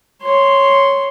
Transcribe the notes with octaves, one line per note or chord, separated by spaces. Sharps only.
C#5 C6